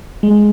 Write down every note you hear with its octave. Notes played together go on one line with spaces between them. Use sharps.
G#3